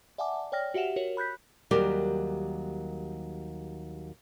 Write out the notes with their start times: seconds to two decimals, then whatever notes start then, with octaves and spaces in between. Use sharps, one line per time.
0.18 D5 E5 F#5 G#5 A5 D6
0.52 C#5 D5 G5 F6 A#6
0.74 F#4 G4 E5 F#5 E7 F7
0.96 F#4 A#4 C#5
1.17 B5 F#6 G6 B6
1.71 D#2 F#3 G3 G4 A#4